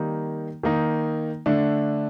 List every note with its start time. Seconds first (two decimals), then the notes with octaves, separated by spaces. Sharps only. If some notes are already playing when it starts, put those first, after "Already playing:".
Already playing: D#3 G3 A#3 D#4
0.63 D#3 A#3 D#4
1.46 D3 A3 D4